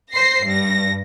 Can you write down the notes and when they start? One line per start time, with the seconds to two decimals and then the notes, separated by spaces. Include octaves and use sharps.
0.13 C5 A#6 C7
0.45 G2 A#6